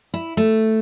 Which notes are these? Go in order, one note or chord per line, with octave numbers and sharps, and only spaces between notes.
E4
A3